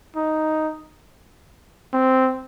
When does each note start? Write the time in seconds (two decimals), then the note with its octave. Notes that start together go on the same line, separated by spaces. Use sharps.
0.16 D#4
1.93 C4